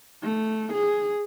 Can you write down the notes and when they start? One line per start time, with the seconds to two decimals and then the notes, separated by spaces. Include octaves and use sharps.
0.24 A3
0.73 G#4